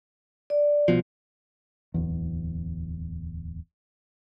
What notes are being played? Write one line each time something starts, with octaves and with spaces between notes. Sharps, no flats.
D5
C2 B2 F3
D1 E2